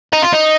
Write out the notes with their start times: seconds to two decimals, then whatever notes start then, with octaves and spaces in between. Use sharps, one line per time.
0.13 D#4
0.22 F4
0.32 D#4